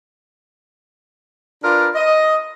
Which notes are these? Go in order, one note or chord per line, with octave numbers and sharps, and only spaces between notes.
D4 F4 A#4 B4 D5
D#5